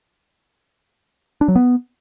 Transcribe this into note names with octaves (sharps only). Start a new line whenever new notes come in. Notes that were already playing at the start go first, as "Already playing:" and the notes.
D4
F#3
B3